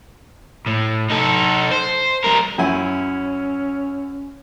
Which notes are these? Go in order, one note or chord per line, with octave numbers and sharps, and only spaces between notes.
A2
D#4 A4
C5
G3 A#4
F#2 C#4 E4 G#5